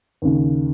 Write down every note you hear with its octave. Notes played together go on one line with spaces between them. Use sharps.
D#2 C#3